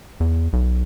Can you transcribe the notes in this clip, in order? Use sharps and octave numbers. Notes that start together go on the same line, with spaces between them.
E2
B1